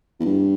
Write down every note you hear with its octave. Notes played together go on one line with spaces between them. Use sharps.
E2
G2